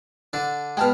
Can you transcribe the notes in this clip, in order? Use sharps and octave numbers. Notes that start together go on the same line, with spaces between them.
D3 D4
B2 G#3 G5 A5 F6